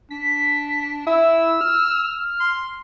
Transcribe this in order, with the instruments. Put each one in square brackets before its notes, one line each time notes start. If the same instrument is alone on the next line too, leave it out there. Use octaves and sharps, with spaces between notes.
[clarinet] D4 [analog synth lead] B6
[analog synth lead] E4 [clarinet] E6
[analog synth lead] F6
[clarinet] C6